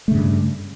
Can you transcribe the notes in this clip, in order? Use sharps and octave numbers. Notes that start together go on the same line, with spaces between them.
G2 C#3 A3